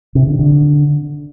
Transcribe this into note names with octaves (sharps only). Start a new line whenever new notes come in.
C3
D3
D3